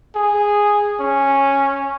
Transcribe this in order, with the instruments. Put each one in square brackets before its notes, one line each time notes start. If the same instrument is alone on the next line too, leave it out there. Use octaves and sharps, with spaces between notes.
[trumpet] G#4
C#4